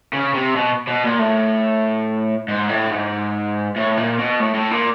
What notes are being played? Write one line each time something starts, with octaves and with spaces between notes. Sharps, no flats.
C#3
C3
B2
B2
A#2
A2
G#2
A2
G#2
A2
A#2
B2
A2
A2
A#2